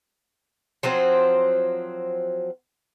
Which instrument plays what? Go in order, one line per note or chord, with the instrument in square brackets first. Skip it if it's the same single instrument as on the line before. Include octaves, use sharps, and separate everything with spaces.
[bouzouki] F3 F#3 C4 C5